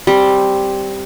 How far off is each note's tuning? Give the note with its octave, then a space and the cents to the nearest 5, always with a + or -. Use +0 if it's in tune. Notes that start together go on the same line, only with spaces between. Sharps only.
G3 +0 C4 +0